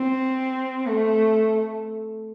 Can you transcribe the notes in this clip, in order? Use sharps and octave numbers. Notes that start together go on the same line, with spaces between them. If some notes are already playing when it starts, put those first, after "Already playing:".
Already playing: C4
A3